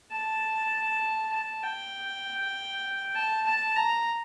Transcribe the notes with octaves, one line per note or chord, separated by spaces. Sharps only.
A5
A5
G5
A5
A5
A#5